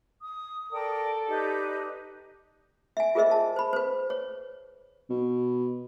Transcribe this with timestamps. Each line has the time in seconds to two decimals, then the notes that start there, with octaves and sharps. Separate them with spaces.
0.22 D#6
0.73 A4 A#4 D5 G5
1.27 D#4 G4 B4 D5
2.97 E5 G#5
3.15 F4 G#4 A#4 C5 D#5 E5
3.31 A5
3.56 C5 B5
3.73 B4 C5
4.10 C#5
5.10 B2